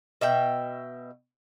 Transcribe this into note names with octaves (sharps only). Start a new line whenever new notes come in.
B2 E5 G5